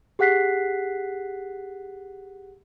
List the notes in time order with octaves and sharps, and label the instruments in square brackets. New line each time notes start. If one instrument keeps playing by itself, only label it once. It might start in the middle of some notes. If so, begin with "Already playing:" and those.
[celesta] G4 G#4 F#5 F#6 B6 C7